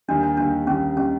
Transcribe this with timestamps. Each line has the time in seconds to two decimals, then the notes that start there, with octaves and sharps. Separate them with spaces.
0.08 D#2 D#3 G3 D4
0.23 D4
0.37 D#2 D#3 G3 D4
0.67 D#2 D#3 G3 C#4
0.97 D#3 G3 C#4